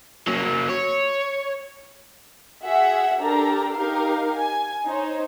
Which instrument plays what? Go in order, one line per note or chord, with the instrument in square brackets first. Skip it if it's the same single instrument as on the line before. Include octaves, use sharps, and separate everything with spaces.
[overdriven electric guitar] F#3 A#3
C#5
[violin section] F#4 G#4 E5 F#5
D4 G4 A4 A#4 A#5
D#4 G4 A#4 F5
G#5
D#4 C5 C#5